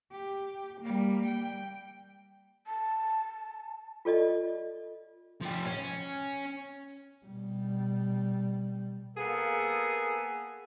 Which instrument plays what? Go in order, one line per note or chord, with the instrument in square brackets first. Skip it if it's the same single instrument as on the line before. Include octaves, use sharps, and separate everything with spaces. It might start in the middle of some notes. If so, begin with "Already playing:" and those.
[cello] G4
G3 A#3
G5
[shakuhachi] A5
[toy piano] F4 A4 D5 D#5
[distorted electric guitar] F3 G4
C#4
[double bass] B2 G3
[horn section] A#3 B3 G#4 A4